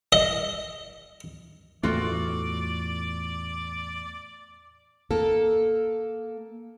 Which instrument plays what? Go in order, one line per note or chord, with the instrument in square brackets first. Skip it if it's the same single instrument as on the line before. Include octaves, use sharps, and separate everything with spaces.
[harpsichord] D#5
[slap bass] E2 A2 A3 [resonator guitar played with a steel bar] F4 F#4 A4 [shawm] D5
[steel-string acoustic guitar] A#3 A4